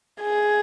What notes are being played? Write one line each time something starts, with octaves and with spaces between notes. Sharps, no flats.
G#4